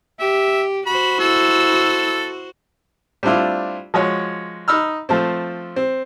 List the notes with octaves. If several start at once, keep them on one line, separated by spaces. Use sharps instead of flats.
G4 E5
F#4 C5 B5
E4 A4 E6
G3 A3 C4 D4 E4 F4
F3 G#3 F#4 C#5
D#4 B5 E6 F6
F3 A3 C4
C4